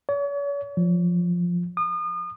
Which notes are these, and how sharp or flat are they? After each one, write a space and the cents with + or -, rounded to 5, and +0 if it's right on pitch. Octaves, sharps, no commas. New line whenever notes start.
C#5 +40
F3 +5
D#6 -35